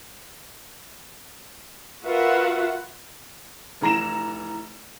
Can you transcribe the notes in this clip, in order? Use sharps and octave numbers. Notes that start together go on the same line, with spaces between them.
F4 F#4 A#4 B4 E5 F#5
F1 E3 A#5 A#6 E7